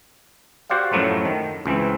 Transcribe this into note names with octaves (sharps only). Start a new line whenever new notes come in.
F#4 G4 C5 D5 F5 F#5
F#2 A2 F3 F#3 A3 E4
D#3
C#2 E3 C4